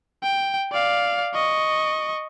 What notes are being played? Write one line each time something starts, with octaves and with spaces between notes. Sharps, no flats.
G5
D5 F5
D#5 C#6